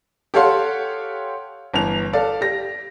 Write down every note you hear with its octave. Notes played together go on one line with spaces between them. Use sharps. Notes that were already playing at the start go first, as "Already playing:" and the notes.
G4 A4 C#5 F5 F#5 C6
G1 E3 F7
A4 D5 F5
G4 A#6